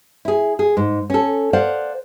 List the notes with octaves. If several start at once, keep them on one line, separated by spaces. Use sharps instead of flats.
E4 G#4
G#4
G#2
C#4 A4
C5 D5 F5 F#5